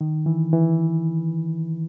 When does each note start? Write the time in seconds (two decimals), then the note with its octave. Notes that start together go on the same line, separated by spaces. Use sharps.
0.01 D#3
0.26 E3
0.53 E3